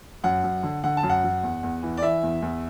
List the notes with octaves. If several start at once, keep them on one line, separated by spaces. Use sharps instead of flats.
F#2 F#5
F#2
D3
D3 F#5
A5
F#2
F#5
F#2
E2
E2
E3
D5
E3 E5
E2
E2